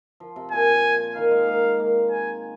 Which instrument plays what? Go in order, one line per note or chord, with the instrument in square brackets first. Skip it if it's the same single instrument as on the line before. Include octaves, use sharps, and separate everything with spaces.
[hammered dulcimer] F3
C3
[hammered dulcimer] A#2 [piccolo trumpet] G#5
[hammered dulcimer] A#2
[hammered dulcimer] D#3 [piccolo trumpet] F5
[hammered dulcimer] G#3
A#3
G#3
A#3
C4
[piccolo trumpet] G#5